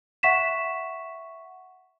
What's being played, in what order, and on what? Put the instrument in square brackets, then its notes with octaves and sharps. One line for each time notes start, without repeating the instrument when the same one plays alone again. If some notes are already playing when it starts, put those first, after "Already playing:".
[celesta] E5 F#5 C#6 B6 E7